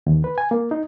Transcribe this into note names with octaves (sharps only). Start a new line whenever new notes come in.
D#2
B4
G#5
A#3
D#4